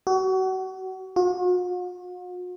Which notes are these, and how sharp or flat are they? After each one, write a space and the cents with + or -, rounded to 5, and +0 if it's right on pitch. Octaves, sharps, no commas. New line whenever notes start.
F#4 +30
F#4 -45